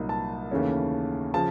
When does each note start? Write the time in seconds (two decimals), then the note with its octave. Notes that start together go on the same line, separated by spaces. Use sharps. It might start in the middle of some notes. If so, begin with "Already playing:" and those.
Already playing: C2 A#2 F#3 A#3 D#4
0.09 A5
0.51 D#2 C#3 E3 A3 C#4
1.34 C#3 F3 A5